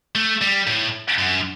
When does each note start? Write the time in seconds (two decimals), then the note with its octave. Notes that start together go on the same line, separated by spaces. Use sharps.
0.15 A3
0.41 G3
0.67 A2
1.18 F#2